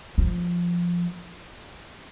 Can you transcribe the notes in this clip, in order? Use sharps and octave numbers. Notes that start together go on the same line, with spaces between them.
F3